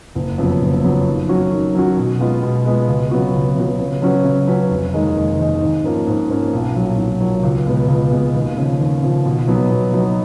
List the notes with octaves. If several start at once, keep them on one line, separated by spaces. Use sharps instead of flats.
F#1
F2 C#3 F#3 B3
F#1
F2 C#3 F#3 B3
D#3
F#3 C#4 F#4
D#3
F#3 C#4 F#4
B2
G#3 B3 F4
B2
G#3 B3 F4
C#2
C#3 F#3 B3 F#4
C#2
C#3 F#3 B3 F#4
C#3
F#3 C#4 F#4 B4
C#3
F#3 C#4 F#4 B4
F1
D#2 D#3 G#3 D#4
F1
D#2 D#3 G#3 D#4
G#2
F3 A#3 C#4
G#2
F3 A#3 C#4
B1
A#2 F#3
B1
A#2 F#3
C#2
B2 G#3 B3
C#2
B2 G#3 B3
D#2
C#3 F3
D#2
C#3 F3
B2
F#3 B3 D#4
B2
F#3 B3 D#4